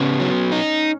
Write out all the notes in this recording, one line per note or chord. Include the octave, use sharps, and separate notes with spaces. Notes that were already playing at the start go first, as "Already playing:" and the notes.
Already playing: C#3 B3 C#4
F#3
D#4